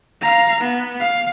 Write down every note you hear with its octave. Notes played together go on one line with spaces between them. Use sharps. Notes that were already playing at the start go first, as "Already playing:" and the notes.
F5 A#5
B3
F5